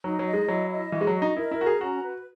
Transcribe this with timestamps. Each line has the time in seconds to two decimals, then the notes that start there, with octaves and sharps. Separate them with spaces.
0.04 F#3 D#4
0.19 F#3
0.26 D#5
0.34 G#3
0.48 F#3 E4
0.70 D#5
0.92 E3 F#4
1.01 G#3
1.07 F#3
1.14 D#5
1.22 D#4
1.37 E4 A#4
1.51 E4
1.59 F#4 A#5
1.66 G#4
1.81 C#4 F#4
2.03 B4